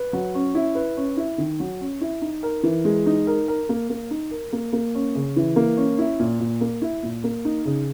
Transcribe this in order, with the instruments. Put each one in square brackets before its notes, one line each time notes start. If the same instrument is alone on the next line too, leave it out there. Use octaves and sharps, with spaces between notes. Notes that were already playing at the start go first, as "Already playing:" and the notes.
Already playing: [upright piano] B4
F#3
C#4
E4
B4
C#4
E4
D#3
F#3
C#4
E4
D#4
A#4
E3
G#3
D#4
A#4
A#4
A#3
A#3
D#4
A#4
A#3
A#3
C#4
C#3
E3
A#3
C#4
E4
A#2
A#2
A#3
E4
A#2
A#3
D#4
C#3